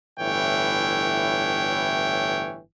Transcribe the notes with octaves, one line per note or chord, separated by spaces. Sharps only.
G1 A2 E3 C#5 G5